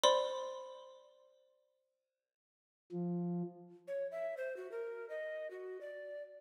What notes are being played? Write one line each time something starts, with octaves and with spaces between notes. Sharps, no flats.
C5 D5 B5 C6
F3
C#5
E5
C5
F#4
A#4
D#5
F#4
D5